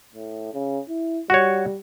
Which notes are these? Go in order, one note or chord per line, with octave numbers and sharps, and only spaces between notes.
A2
C#3
E4
G3 F#4 C#5